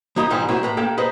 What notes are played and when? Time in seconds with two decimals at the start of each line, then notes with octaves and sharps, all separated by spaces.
0.16 F3 A#3 D#4 D#5 A#5 B5
0.30 G#2 E3 F3 G3
0.49 F#3 G3 A#3 C4 E4
0.63 A2 B4 A#5
0.77 A#3 G4 A4 G5
0.98 D#4 G#4 B4 C5 D#5